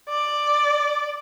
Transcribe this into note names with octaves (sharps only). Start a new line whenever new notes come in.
D5